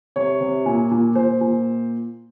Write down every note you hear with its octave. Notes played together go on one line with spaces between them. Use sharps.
C3 C#5
C3
A#2
A#2
A#2 C5
A#2